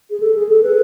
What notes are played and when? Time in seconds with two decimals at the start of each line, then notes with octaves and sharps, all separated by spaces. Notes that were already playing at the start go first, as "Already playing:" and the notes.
0.10 G#4
0.20 A4
0.35 G#4
0.49 A4
0.63 B4